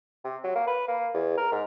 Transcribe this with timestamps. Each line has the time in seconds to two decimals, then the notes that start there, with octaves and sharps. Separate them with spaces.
0.25 C3
0.44 F#3
0.55 A#3
0.68 B4
0.88 A#3
1.14 E2
1.38 A#4
1.52 G#2